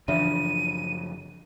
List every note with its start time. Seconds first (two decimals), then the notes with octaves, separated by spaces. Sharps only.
0.08 F#2 C#3 E3 F3 D4 E5 D#7